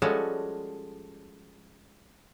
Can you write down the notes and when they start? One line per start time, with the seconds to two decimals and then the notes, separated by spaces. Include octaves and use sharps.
0.02 F3 G3 G#3 C#4 F#4 A4